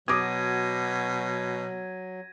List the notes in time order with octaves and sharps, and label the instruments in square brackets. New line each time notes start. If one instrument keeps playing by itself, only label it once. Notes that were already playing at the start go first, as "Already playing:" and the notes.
[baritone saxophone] B2 [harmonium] F#3 [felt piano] D6 D#6 [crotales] G#6 A#6 D#7